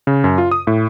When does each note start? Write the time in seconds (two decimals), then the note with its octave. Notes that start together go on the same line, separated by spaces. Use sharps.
0.07 C#3
0.24 F#2
0.38 F4
0.51 D#6
0.67 A2